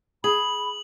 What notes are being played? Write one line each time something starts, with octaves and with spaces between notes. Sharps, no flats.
G#4 B5 F#7